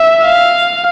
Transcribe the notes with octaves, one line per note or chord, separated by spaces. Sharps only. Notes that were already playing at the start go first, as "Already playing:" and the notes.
Already playing: E5
F5